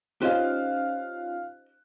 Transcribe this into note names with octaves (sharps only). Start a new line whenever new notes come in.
C#4 D#4 F4 G4 C5 D#5 F5 F#6